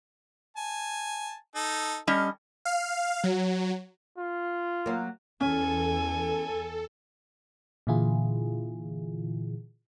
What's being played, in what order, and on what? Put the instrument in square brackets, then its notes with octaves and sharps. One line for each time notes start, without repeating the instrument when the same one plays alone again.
[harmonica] G#5 A5
D#4 A4
[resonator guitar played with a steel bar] G3 C#4 D#5 [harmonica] A4
[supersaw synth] F5
F#3
[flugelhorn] F4
[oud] F#3 A#3
[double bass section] E2 [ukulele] C#4 [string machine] A4 [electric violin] G#5
[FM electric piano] A#2 D3 E3 E4 F4 G#4